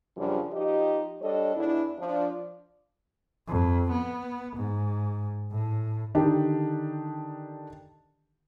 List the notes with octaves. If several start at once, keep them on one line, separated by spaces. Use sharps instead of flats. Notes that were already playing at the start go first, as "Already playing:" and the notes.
F#2 C#3 F3 G3 D4
F3 D#4 G4 D#5
G3 D4 A4 C#5 D#5
E2 D4 E4
F3 D4
F2
B3
G#2
A2
D3 D#3 D4 D#4 G4